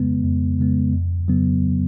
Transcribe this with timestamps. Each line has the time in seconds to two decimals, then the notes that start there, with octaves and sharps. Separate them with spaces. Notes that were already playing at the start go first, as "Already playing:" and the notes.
Already playing: F2 C#3 G#3 B3
0.24 F2
0.59 C#3 G#3 B3
0.93 F2
1.28 C#3 F#3 B3